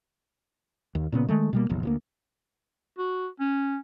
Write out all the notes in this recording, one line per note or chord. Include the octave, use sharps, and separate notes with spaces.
D#2
A#2 C#3 B3
D#3 G#3 A3
B2 G3 A#3
F1 A#1 E2
D2 F3 A#3
F#4
C#4